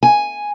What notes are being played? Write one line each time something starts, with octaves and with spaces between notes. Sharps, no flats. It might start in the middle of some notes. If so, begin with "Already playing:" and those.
G#5